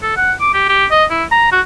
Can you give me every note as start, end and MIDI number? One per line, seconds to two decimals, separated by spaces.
0.03 0.15 69
0.17 0.33 78
0.41 0.50 86
0.54 0.69 67
0.69 0.86 67
0.91 1.05 75
1.10 1.24 64
1.32 1.49 82
1.52 1.61 66